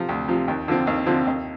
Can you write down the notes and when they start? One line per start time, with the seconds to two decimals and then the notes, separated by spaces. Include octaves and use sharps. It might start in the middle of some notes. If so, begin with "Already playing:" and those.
Already playing: C3 F3
0.09 D2
0.28 C3 F3
0.48 D#2
0.68 D3 F3 C4
0.87 D#2
1.06 D3 F3 C4
1.27 D#2